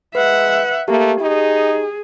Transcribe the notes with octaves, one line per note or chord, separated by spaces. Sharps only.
G#3 B4 E5 F#5
A3 A#3 G4
D#4 G#4